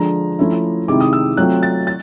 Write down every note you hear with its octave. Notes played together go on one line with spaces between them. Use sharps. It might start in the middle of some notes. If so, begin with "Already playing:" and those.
Already playing: D3 F3 G#3 A#5
F3 A3 C#4 E4
C3 D#3 G#3 C4 E4 D6
D#6
E6
F#3 A3 C4 F4 F#6
A6
A6